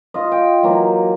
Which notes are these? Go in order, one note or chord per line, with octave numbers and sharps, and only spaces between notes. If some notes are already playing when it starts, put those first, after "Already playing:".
F4 D#5
G5
E3 F#3 A#3